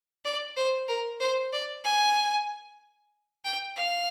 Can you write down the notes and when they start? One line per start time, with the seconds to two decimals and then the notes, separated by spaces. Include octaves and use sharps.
0.25 D5
0.57 C5
0.88 A#4
1.20 C5
1.53 D5
1.85 G#5
3.45 G5
3.77 F5